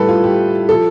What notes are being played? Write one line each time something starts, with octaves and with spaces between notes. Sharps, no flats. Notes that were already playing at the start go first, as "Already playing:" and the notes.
Already playing: A2 G3 A4 B4
F4
G4
F3 A4